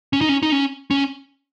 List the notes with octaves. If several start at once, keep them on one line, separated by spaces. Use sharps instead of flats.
C#4
D#4
C#4
D#4
C#4
C#4